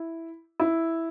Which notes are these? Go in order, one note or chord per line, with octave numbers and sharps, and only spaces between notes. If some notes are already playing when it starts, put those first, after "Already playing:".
Already playing: E4
E4